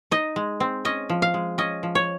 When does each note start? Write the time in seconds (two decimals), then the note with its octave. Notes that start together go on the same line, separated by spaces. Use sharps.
0.11 D#4 D#5
0.36 G#3
0.60 C4
0.85 C#4 D#5
1.09 F3
1.22 F5
1.34 G#3
1.58 C#4 D#5
1.83 F3
1.95 C#5